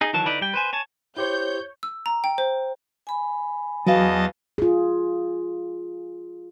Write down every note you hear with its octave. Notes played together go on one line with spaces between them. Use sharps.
D#4 G#4
D#3 E3 F#3 A5
D3 D#4 E4 B4 D5
G3 G5
B4 C5 G#5
C#5 G#5 A5
E4 G4 C5 C#5 G6
E6
A#5
G5
C5
G#5 B5
E2 E3 F#3 F#4 D#5 F5 A5
F4 G#4